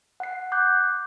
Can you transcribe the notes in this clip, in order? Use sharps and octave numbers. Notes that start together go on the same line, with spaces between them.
F#5 C7
D6 F#6 G6